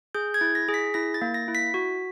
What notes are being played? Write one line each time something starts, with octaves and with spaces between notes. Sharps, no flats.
G#4 G6
G#6
E4
A#6
G#4
B6
E4 A#6
A6
A#3
A#6
E4
B6
F#4